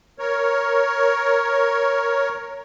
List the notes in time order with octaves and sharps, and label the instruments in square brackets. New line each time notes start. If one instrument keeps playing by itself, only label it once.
[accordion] A#4 C#5